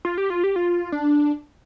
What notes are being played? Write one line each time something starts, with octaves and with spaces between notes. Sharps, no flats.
F4
G4
F4
G4
F4
D4